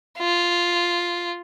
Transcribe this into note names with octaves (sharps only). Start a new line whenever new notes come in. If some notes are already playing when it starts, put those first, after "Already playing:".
F4